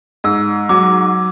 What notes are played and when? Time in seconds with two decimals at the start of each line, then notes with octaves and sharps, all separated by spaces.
0.24 G#2 E6
0.69 F#3 D6